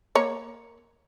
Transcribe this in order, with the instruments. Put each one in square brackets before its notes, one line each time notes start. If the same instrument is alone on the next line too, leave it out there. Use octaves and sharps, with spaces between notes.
[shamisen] A#3 C#5